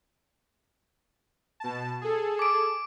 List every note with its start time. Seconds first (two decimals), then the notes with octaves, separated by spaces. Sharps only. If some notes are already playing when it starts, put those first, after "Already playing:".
1.60 B2 A5
2.01 G#4 A4
2.39 D6 D7